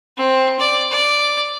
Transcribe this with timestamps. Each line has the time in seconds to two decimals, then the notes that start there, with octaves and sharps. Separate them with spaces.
0.17 C4
0.60 D5
0.91 D5